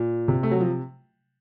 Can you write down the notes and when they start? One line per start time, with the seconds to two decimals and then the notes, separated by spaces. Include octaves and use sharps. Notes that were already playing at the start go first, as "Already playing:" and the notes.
Already playing: A#2
0.28 C3
0.43 A3
0.51 F#3
0.60 F3